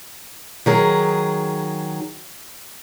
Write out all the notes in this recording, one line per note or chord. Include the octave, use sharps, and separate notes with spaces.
D#3 F#3 G#4